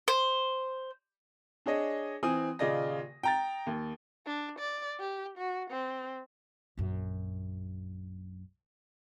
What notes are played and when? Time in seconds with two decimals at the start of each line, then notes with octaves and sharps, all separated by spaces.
0.08 C5
1.66 D4 G#4 C#5 D#5
2.23 E3 C4 G#5 D#6
2.59 D#1 C#3 F4 D5 D#5 A#6
3.23 G5 A#5 A6
3.67 D#2
4.26 D4
4.59 D5
5.00 G4
5.38 F#4
5.70 C4
6.77 A#1 F#2